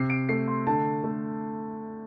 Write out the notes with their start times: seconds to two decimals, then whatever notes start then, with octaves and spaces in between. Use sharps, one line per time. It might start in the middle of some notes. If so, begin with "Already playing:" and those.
Already playing: C3 C7
0.10 D7
0.29 A3 C7
0.48 C6
0.67 D3 A5
1.03 A3